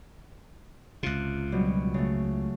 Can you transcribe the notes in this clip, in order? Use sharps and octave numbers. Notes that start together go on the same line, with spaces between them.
C#2 C3 F4 F#6
B2 F#3 G3
C#3 A3